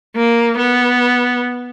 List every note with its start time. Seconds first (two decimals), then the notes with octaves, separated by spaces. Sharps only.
0.16 A#3
0.57 B3